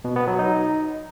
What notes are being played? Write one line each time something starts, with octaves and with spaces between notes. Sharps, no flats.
B2
B3
F#3
D#4